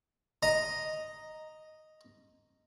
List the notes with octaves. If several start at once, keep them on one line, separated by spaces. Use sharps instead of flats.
D#5 A#5